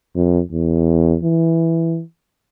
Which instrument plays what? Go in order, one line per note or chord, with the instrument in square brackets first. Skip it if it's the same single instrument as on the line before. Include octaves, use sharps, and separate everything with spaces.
[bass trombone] F2
E2
E3